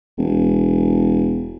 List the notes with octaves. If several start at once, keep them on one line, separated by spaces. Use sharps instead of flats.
E1